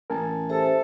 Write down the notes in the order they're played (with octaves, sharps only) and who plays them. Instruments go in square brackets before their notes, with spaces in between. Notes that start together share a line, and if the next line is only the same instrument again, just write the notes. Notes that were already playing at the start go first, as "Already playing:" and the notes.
[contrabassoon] A1 [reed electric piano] A#4 G#5 A5
[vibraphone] G4 C5 E5 [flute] A4